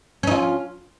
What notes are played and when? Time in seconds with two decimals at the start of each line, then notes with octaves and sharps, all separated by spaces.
0.23 C#4
0.27 D#4
0.31 F4